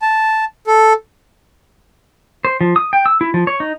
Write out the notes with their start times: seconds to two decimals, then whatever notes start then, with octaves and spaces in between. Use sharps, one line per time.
0.02 A5
0.67 A4
2.45 C5
2.61 F3
2.76 D#6
2.93 G5
3.06 E6
3.21 E4
3.34 F3
3.47 C#5
3.60 D#4